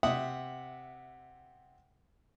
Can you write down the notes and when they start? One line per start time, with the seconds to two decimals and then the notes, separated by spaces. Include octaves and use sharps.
0.03 C3 E5 F#5 D#6